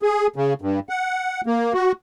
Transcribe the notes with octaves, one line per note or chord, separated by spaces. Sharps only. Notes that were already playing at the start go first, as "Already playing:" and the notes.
G#4
C#3
G2
F#5
A#3
F#4